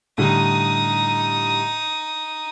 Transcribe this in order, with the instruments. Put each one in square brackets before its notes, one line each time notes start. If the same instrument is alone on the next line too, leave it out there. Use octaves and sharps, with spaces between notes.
[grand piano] A2 D3 G3 [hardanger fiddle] D#4 D#6